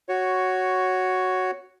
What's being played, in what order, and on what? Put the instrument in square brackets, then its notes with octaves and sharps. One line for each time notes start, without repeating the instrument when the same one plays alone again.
[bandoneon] F#4 C#5